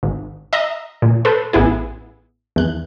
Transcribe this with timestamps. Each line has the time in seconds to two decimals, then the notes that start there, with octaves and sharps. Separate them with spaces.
0.03 G#1
0.53 D#5 E5 A#5
1.02 A#2
1.25 A4 B4 C5
1.53 A1 B3 E4 G#4
2.56 E2 F#6